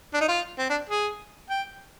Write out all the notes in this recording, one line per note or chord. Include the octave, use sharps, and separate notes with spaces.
D4
D#4
F4
C4
D4
G#4
G5